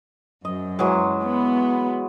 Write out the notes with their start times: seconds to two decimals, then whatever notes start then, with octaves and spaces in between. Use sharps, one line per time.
0.45 F#2 D#5
0.79 E3 F#3 G#3
1.23 B3